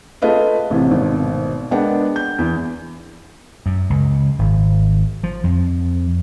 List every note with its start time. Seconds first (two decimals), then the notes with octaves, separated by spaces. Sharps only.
0.22 A3 F4 G#4 B4 D#5 F5
0.70 A1 A2 C3
0.91 G#1 B2 D#3
1.71 G#3 B3 D4 A#4 F#5 G5
2.16 G6
2.38 E2
3.66 F#2
3.90 C#2
4.39 G#1
5.24 F3
5.44 F2